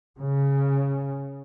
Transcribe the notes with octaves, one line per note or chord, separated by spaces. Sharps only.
C#3